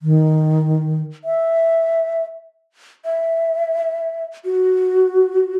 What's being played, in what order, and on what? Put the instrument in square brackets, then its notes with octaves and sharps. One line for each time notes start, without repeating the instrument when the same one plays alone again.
[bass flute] D#3
E5
[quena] E5
F#4